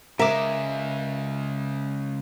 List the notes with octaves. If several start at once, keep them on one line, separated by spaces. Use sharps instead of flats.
C#3 G#3 A#4 E5 D6